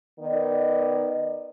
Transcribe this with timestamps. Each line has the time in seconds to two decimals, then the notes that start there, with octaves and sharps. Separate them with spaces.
0.19 D#3 B3 D5 D#5